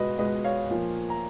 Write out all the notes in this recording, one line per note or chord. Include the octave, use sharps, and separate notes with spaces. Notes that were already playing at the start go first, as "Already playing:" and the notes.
Already playing: C#2 B2 G#3 F#4 B4 D#5
C#2 B2 G#3 B4 D#5
C#5 F5
A#2 F3 A#3
A#5